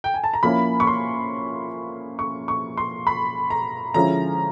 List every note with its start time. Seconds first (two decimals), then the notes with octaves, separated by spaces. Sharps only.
0.04 G5
0.14 G#5
0.24 A5
0.34 A#5
0.43 F3 A#3 C#4 E4 B5
0.80 C#6
0.87 C6
2.19 C#6
2.48 C#6
2.77 C6
3.07 B5
3.50 A#5
3.94 D3 F3 G#3 C#4 E4 A#5